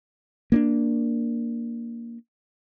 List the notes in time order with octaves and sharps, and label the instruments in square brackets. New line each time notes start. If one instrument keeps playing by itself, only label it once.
[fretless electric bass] A#3 C#4 D4